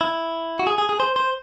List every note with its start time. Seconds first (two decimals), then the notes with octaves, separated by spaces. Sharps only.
0.01 E4
0.59 F#4
0.67 G#4
0.78 G#4
0.89 G#4
1.00 C5
1.16 C5